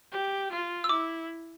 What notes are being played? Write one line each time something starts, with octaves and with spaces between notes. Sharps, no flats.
G4
F4
E6
E4 D6